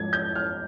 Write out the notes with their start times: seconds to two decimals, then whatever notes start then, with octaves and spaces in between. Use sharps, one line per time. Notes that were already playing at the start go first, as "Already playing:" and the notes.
Already playing: G#2 F3 G#6
0.13 G6
0.35 F6